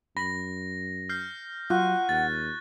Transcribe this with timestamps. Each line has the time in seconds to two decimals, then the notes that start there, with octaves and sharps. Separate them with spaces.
0.17 F#2 B5 A#6
1.09 F6 G6 C7
1.70 F#3 F4 F#5 C#6 F#6
2.09 D#2 A6